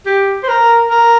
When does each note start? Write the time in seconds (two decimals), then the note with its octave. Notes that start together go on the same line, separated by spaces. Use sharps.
0.06 G4
0.43 C5
0.48 A#4
0.90 A#4